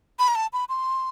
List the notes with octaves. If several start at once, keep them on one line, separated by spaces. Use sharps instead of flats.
B5
A#5
A5
B5
C6